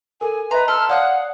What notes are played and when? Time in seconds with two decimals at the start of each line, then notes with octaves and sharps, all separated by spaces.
0.21 A4 A#4 G#5
0.51 B4 D#5 E5 A#5 C6
0.68 A4 A5 C6 E6 F6
0.89 C#5 D5 F5 F#5 D#6 F#6